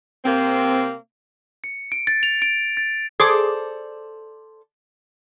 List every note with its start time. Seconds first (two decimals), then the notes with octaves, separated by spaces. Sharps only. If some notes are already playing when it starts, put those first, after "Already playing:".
0.24 C3 A#3 C4
1.64 C#7
1.92 D7
2.07 A6
2.23 F7
2.42 D7
2.77 A6
3.20 G#4 A4 C5 D5 D6